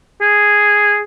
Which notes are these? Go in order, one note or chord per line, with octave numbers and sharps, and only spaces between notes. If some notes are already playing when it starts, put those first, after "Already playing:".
G#4